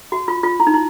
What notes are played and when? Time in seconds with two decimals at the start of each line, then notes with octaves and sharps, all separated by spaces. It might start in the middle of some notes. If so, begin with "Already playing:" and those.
0.12 F#4
0.28 F4
0.43 F4
0.60 E4
0.67 D#4
0.74 E4